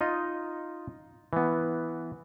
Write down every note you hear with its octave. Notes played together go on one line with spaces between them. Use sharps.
D#4 F4 D#5
E3 B3